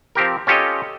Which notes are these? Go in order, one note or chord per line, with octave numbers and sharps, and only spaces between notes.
F3 C4 G4 A#4
C#4 F4 G4 A4 C#5 D#5